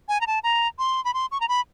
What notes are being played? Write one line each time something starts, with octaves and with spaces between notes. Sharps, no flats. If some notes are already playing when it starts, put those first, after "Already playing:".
G#5
A#5
A5
A#5
C6
B5
C6
C#6
A#5
B5